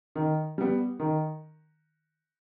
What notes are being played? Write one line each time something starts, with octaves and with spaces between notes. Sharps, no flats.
D#3
G3 B3
D#3